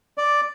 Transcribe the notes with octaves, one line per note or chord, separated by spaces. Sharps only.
D5